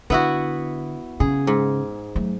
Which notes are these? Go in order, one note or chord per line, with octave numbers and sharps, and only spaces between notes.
D3 B3 E4 F#4
C#3 G#4
G#2
F#3 A3